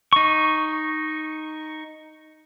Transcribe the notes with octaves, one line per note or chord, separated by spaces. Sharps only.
D#4 C#6